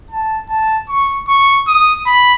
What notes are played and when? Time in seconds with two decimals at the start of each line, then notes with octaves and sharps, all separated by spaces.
0.11 A5
0.49 A5
0.89 C#6
1.28 C#6
1.68 D#6
2.06 B5